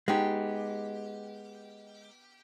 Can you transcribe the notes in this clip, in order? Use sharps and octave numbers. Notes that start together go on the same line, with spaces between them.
G#3 B3 D#4 G4